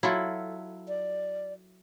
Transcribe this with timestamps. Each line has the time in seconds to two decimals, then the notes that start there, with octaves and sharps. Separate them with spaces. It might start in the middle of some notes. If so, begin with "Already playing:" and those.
0.03 F#3 E4 F4 A4
0.88 D5